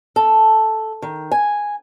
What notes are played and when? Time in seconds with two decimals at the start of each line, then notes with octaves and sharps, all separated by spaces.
0.16 A4
1.02 D#3
1.31 G#5